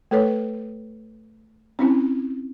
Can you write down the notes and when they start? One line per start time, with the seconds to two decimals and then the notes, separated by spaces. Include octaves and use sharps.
0.11 A3 A4 B4 C#5
1.79 C4 C#4 E4